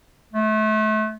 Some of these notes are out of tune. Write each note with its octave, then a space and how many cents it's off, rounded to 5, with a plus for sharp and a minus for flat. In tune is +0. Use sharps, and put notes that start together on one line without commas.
A3 -30